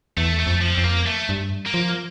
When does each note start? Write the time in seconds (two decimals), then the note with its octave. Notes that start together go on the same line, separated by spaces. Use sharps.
0.17 E2 A3
0.40 A3
0.47 F2
0.62 F3
0.75 F2 C4
0.84 A#3
1.06 A3
1.29 G2
1.67 A#3
1.74 F3